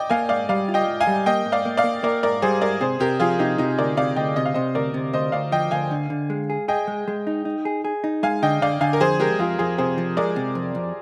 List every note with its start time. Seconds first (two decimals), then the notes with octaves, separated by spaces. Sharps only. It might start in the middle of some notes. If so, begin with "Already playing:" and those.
Already playing: D5 D#5 G5
0.10 A#3 F5 G#5
0.29 G#2 D5 F5
0.49 G3 D5 F5
0.69 F4
0.74 D#5 G5
0.88 G#2
1.00 F5 G#5
1.07 G3
1.26 A#3 D#5 G5
1.46 G#2
1.52 D5 F5
1.65 A#3
1.77 D5 F5
1.84 A#3
2.03 A#3 A#4 D5
2.23 G#2 A#4 D5
2.42 G3 G#4 C5
2.62 G#2 A#4 D5
2.81 C3 G#4 C5
3.00 C3 G4 A#4
3.20 F3 F4 G#4
3.39 C3 D#4 G4
3.58 C3 D#4
3.78 D2 A#4 D5
3.97 C3 D5 F5
4.16 D2 D#5 G5
4.36 C3 D#5
4.45 F5
4.54 C3 C5 D#5
4.75 D2 A#4 D5
4.94 C3
5.13 D2 C5 D#5
5.32 D2 D5 F5
5.52 F3 D#5 G5
5.71 D2 F5 G#5
5.91 D3
6.10 D3
6.30 G#3
6.50 G#4
6.68 G#4 D#5 G5
6.87 G#3
7.08 G#3
7.27 D#4
7.45 D#4
7.65 G#4
7.84 G#4
8.04 D#4
8.23 G#3 F5 G#5
8.42 D3 D#5 G5
8.62 D3 D5 F5
8.81 D3 F5 G#5
8.93 A#4
9.00 F2 G#4 C5
9.19 G#3 G4 A#4
9.39 F2 F4 G#4
9.59 F2 F4 G#4
9.78 C3 G#4 C5
9.98 F3
10.17 G#3 A#4 D5
10.36 C3
10.55 F2
10.75 F2